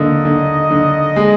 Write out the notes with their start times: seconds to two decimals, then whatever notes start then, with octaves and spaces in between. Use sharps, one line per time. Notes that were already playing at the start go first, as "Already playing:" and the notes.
Already playing: D3 A#3 D#5
0.25 D3
0.71 D3
1.16 G#3